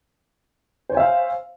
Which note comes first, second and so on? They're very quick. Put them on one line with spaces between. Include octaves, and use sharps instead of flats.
C5 C#5 G#5 E5 F5